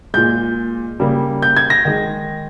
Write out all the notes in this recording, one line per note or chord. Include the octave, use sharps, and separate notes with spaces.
A#2 G#3 G6
C#3 G3 A#3
G6
G#6
A#6
D#3 G#3